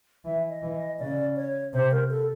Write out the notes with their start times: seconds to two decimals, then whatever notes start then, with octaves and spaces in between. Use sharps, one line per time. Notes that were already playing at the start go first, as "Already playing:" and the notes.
0.25 E3 E5
0.49 D#5
0.62 E3
0.74 D#5
0.99 C#3 D5
1.36 C#5
1.73 C3 C5
1.91 A#4
2.10 A4